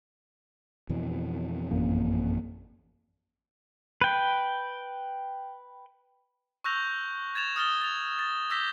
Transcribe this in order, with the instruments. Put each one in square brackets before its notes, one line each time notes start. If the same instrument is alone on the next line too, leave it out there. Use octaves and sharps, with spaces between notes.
[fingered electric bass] F2 B2 E3
[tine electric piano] A1 F#2 A#3
[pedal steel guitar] B4 G5
[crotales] C#6 E6 F#6 G6 A#6 F7
G#6 A6 E7 F7
D#6 F6 A6 G7
A6 F7
A6
D6 E6 G6 A#6 B6 G7